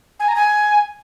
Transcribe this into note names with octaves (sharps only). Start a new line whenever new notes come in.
G#5
A#5
G#5